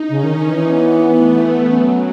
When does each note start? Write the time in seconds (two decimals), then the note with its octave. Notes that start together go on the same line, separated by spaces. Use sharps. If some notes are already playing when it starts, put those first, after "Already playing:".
Already playing: D#4
0.09 C#3 C#4
0.23 D#3
0.36 D#3
0.49 E3
0.63 B3
1.16 A3
1.69 F#3 C#4